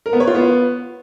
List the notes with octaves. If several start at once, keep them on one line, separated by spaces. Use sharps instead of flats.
A#4
B3
C#5
F4
B3